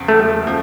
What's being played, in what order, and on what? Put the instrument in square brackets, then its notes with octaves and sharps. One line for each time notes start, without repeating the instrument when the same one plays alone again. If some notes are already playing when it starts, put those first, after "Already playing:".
Already playing: [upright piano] E2 C#3 F3
[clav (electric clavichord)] A3
[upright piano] F3